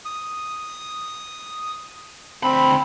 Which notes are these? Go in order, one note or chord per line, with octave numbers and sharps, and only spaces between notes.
D#6
D2 C4 B5